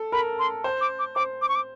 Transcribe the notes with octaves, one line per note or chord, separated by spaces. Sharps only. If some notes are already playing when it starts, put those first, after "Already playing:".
Already playing: A4
A#4 B5
C6
C5
D6
D6
C5 D6
D6
C#6
D6